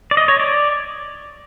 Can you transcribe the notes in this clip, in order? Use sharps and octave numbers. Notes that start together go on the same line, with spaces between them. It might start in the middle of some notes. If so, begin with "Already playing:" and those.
D5
D#5
C#5
D5